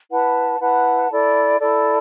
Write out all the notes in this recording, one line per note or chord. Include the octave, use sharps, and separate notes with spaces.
E4 B4 F#5 A5
E4 B4 F#5 A5
E4 A4 D5
E4 A4 D5